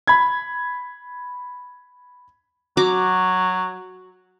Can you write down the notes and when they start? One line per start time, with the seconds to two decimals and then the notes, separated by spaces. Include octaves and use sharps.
0.07 B5 G#6
2.77 F#3 F#4 A#5 D6